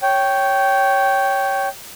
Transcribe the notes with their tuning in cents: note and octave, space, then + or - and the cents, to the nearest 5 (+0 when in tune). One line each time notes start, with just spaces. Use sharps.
C#5 +0 G5 -10